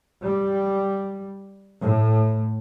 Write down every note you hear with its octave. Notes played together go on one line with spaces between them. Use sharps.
G3
A2